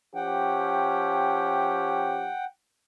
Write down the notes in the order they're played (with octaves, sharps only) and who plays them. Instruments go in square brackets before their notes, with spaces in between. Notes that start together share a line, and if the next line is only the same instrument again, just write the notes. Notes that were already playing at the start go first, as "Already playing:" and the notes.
[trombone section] F3 C#4 G4 [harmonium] F#5 G5